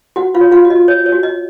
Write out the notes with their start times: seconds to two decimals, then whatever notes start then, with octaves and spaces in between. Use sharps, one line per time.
0.16 F#4 F#5
0.35 F4 F5
0.41 C#5
0.52 F4 F5
0.65 F#4
0.70 D#5
0.88 C#5
1.06 C#5
1.12 F#4
1.23 D#5